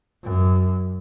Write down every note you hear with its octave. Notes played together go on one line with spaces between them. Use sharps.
F#2